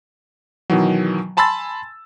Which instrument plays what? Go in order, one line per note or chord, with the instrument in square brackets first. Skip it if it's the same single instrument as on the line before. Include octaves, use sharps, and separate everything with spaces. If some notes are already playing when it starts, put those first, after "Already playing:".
[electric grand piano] B2 D#3 E3 F#3
G#5 A5 B5 C6 E6 A6